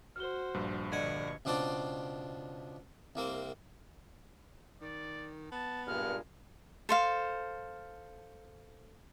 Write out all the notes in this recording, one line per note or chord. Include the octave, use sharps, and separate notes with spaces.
F#4 C5 F6 G7
A#1 G2
D3 D4 D#5 F#5 C#6 G#6
C#2 B2 C4 D4 D5
C2 A#3 C4
D#3 D5
B3 A5
G2 A#2 G#3 F6
A4 C5 F5